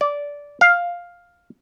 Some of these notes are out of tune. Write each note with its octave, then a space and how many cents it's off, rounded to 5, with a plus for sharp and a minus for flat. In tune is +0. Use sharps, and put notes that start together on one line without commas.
D5 -15
F5 +5